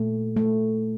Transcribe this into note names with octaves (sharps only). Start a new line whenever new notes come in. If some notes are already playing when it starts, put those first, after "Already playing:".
Already playing: A#2 A3
A3